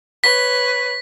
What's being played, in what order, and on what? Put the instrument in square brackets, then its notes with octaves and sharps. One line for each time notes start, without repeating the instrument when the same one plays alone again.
[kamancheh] B4 C#5 [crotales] B6